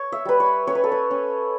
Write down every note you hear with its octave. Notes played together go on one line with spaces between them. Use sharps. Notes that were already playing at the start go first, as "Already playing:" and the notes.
Already playing: C#5
E5
G3 B4
C#5
C#4 C#5
B4
A4
B4
C#4